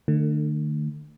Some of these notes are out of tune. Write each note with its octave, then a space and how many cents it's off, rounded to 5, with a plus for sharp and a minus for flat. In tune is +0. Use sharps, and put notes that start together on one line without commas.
D3 +45 A3 +25